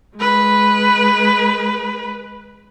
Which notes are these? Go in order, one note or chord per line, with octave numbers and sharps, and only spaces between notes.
G#3 B4